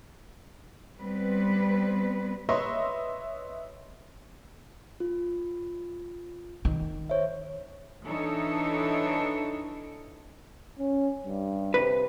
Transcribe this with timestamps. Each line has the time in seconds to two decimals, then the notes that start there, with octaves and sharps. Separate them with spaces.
1.00 G3 B3 C4 B4
2.49 B4 C#5 D#5 E5 C6 C#6
5.00 F4
6.65 D#3
7.09 C5 C#5 E5
8.04 E3 D4 D#4 A4 C#5
10.79 C#4
11.24 G2
11.74 C3 B4